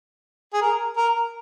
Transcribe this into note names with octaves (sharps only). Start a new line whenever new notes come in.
G#4
A#4
A#4